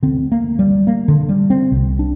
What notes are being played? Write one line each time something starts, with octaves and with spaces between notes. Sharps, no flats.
D2 D3 C4
A#3
G3
A#3
D3
G3
C4
C2 C3
D4